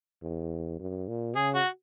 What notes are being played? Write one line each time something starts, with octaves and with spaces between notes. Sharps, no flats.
E2
F#2
A#2
C#3 G#4
F#4